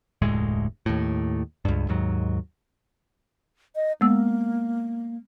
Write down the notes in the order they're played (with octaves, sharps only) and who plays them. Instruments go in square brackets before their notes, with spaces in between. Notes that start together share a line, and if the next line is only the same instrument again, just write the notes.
[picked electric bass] F1 D2 A2 G#3
D#2 A2
C#2 G2
D#2 G#2 F#3
[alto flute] D#5
[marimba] G#3 B3 E6 [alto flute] A#3